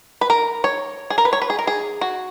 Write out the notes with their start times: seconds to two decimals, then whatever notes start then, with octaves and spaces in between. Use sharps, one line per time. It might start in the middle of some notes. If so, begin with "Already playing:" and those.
0.21 B4
0.30 A#4
0.64 C#5
1.10 G#4
1.18 A#4
1.25 B4
1.33 C#5
1.42 B4
1.50 G#4
1.59 A#4
1.67 G#4
2.01 F#4